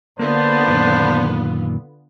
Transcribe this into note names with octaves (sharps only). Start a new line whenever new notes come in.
D3 A#3 B3 F4 C5 D5 A5
F#2 A#2 D#3